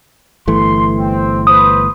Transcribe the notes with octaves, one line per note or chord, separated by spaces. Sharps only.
G1 E3 A3 C6
C4
B4 C5 D#6